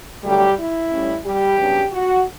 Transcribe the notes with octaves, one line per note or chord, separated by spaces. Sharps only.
E2 D3 F#3 G3 A3 G4
E4
A2 G3 C#4
G3 G4
F#2 C#3 G3 B3 D4
F#4